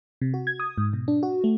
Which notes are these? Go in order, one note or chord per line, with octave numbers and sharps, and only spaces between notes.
C3
F#4
G#6
D#6
G#2
B2
D4
F#4
A3